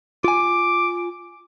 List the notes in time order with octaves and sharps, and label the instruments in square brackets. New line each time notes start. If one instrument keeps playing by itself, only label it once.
[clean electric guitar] F4 G#5 [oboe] D6